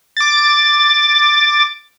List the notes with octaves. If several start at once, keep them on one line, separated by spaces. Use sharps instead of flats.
D6 A6